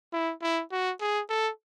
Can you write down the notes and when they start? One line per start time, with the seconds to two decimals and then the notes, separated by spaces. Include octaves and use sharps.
0.13 E4
0.42 E4
0.71 F#4
1.01 G#4
1.29 A4